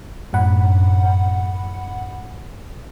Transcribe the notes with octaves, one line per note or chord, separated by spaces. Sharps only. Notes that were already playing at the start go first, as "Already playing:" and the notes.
F#2 A2 F#5 B5